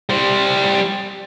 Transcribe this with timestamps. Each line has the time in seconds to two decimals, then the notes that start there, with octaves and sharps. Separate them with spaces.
0.10 G3 C5